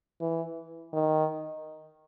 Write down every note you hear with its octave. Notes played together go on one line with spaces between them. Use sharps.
E3
D#3